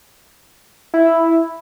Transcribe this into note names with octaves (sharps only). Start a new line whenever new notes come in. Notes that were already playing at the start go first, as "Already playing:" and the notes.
E4